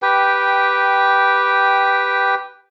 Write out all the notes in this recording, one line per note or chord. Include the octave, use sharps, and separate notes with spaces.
G4 B4 G5